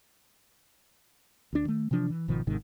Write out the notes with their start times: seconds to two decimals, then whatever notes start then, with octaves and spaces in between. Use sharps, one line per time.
1.53 D2 D4
1.65 D#3 A3
1.91 C3 E3 F3 D4
2.10 E3
2.28 G#1 B2 D#3 F3
2.47 G#1 G#2 C3 D#3